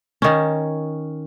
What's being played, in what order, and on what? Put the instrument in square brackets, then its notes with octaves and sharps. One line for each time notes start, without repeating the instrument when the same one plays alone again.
[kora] D#3 C#4